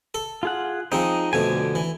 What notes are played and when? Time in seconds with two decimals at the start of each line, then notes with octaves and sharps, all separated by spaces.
0.14 A4
0.43 F4 G#4 F#5
0.92 F3 G#3 C4 D#4
1.33 F2 B2 D3 A3 G#5
1.75 E3